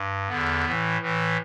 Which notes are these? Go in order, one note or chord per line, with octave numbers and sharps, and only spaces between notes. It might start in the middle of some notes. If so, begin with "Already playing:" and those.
Already playing: G2
E2 D3 B3
A2 E3
A2 E3